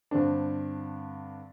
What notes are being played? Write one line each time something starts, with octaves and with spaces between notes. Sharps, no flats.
G2 D3 C4 D4